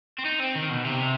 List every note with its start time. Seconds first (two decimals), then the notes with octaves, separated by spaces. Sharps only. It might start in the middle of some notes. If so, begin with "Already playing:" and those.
0.18 C4
0.25 D#4
0.40 C4
0.55 D#3
0.70 B2
0.85 C3